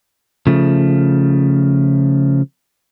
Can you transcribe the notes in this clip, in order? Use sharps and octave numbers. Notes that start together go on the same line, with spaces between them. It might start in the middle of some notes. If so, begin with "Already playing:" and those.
C#3 F3 A3